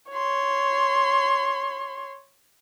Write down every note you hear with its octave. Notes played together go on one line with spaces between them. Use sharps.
C#5 C6